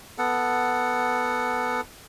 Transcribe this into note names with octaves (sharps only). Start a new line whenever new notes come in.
B3 A4 F#5